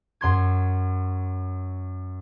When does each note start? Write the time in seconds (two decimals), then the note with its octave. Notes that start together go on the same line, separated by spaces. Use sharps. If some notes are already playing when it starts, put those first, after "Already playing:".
0.21 F#2 C6 G#6